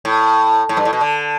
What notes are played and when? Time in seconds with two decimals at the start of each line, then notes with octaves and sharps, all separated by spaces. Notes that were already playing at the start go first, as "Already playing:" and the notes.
0.05 A2
0.69 A2
0.77 G2
0.85 A2
0.93 B2
1.01 D3